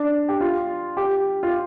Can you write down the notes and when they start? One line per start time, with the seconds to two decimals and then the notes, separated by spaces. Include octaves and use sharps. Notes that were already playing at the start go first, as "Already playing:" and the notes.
Already playing: D4
0.29 G4
0.41 F4
0.97 G4
1.43 F4